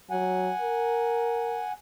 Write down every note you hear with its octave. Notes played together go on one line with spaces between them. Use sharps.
F#3 F#5 G#5
A#4